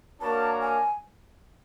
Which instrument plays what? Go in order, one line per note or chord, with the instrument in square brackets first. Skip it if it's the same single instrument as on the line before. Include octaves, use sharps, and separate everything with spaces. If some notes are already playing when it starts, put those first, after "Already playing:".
[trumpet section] A#3 D4 F#4 A#4 C#5 [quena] A5
[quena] G#5